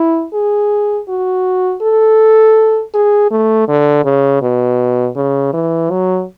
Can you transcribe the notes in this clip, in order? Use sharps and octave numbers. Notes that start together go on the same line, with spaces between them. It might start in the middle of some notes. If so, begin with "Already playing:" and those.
Already playing: E4
G#4
F#4
A4
G#4
A3
D3
C#3
B2
C#3
E3
F#3